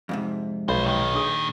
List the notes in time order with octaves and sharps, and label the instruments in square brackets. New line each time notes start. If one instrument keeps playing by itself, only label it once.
[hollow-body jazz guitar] F2 G#2 C3
[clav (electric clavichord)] B1 [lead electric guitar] F#3 C5 [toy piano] B5
[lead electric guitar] A#2 D#3 [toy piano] G5
[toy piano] D4 G#4 D#6